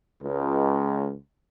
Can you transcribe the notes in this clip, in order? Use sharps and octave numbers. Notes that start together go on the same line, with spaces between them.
C#2